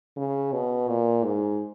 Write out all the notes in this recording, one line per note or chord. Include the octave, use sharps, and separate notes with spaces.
C#3
B2
A#2
G#2